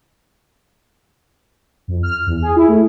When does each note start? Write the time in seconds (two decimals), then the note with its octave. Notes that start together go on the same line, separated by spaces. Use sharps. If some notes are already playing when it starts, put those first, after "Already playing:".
1.88 F2
2.03 F6
2.26 E2
2.42 G#4
2.56 E4
2.68 A3